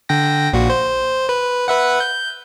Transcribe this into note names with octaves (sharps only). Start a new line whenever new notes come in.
D3 G5 A#6
A#1 A#2 F#4
C5
B4
B4 E5 F#5
G6